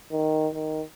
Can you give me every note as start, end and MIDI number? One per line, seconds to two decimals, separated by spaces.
0.12 0.49 51
0.55 0.82 51